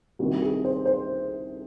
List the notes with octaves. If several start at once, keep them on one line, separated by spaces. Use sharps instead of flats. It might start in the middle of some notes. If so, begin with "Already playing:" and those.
C2 C3 D#3 F#4
G#4
C5
C5